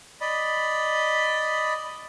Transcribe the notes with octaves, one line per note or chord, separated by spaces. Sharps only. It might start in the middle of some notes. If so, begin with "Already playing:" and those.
D5 D#5 B5